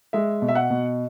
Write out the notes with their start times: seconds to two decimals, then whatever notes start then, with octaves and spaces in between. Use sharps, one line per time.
0.13 G#3 E5
0.42 B2
0.48 E5
0.55 F#5
0.70 B2